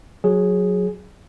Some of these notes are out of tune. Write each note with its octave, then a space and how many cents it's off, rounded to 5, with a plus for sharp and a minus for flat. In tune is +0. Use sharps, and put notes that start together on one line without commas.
F#3 -15 G#4 +0